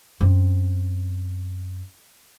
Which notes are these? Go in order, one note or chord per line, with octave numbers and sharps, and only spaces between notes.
F#2 C4